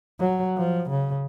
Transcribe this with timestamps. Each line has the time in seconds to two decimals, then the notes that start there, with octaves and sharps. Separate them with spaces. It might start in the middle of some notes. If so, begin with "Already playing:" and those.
0.19 F#3
0.57 F3
0.90 C#3